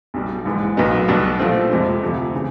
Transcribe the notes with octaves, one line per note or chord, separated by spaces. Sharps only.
B1 B2 G3
A#1 G#2 E3
B1 A#2 F#3 B3 D#4
B1 B2 G3 B3 D4
A#2 F3 A3 C4
F2 C3 F3 G#3
D2 C3 F3
C#3 E3